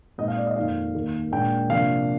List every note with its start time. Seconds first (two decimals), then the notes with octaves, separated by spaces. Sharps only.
0.18 A#2 G#3 C4 D#4 D#5
0.28 F5
0.37 D5
0.47 D#5
0.56 F2 D#3 A#3 D#4 F5
0.94 D#2 D#3 A#3
1.32 A#2 G#3 D4 G5
1.69 C3 F3 A#3 D4 F5